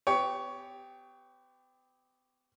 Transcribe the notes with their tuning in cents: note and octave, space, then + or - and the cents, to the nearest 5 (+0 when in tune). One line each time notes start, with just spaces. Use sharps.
B3 +40 G4 +0 C#5 +15